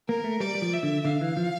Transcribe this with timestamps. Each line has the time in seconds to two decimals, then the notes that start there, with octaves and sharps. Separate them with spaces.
0.08 A#3 A#4
0.24 A3
0.40 G3 D5
0.55 G3
0.62 F3
0.73 E5
0.83 D3
1.05 D3 F5
1.21 E3
1.37 F3